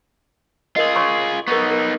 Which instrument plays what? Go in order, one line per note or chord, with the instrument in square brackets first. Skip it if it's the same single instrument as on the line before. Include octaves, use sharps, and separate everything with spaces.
[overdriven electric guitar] F4 G#4 [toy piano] A#4 D#5
[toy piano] C#5 C6 C#6
[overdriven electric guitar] B3 D#4 [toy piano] A#4 C#6
[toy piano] A#4